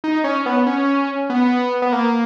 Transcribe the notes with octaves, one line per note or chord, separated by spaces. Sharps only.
D#4
C#4
B3
C#4
B3
B3
A#3